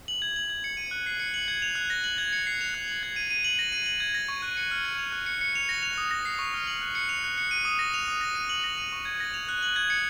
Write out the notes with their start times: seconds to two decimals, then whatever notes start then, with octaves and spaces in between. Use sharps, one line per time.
0.08 F#7
0.22 G#6
0.36 F#7
0.49 G#6
0.64 C#7
0.77 D#7
0.91 F#6
1.06 C7
1.20 C#7
1.34 F#7
1.48 G#6
1.62 F7
1.75 F#6
1.90 A#6
2.04 F#7
2.18 G#6
2.33 C#7
2.47 C7
2.61 F7
2.74 F#6
2.88 F#7
3.03 G#6
3.16 D#7
3.31 D#7
3.44 F#7
3.59 A#6
3.72 D#7
3.86 F#7
4.00 G#6
4.14 A#6
4.28 C#6
4.42 F#6
4.57 C#7
4.71 F6
4.85 G#6
4.98 F7
5.12 F#6
5.26 C#7
5.41 C#7
5.55 F7
5.69 A#6
5.83 F7
5.98 D#6
6.11 A#6
6.25 C7
6.39 C#6
6.54 F6
6.67 F#7
6.82 F#6
6.95 C#7
7.09 F7
7.24 F#6
7.38 C#7
7.51 D#7
7.65 D#6
7.79 A#6
7.94 F7
8.08 D#6
8.21 A#6
8.36 D#7
8.49 F#7
8.64 A#6
8.78 D#7
8.92 C#6
9.05 G#6
9.20 A#6
9.34 F7
9.49 F#6
9.62 F#7
9.76 G#6
9.90 C#7